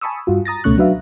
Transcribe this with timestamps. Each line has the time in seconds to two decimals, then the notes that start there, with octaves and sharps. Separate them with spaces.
0.01 G#5 A5 B5 C#6 D#6 E6
0.27 G2 F4 F#4
0.45 A#5 D#6 A6 A#6
0.64 C#2 B2 A3 C#4 C#6 F#6
0.78 F#3 D4 F#4 B4 E5 F5